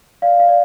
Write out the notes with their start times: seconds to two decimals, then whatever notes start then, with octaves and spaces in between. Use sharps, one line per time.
0.22 D5 F5
0.40 F5
0.48 D5